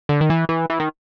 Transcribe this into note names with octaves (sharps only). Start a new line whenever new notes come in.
D3
D#3
E3
E3
E3
D#3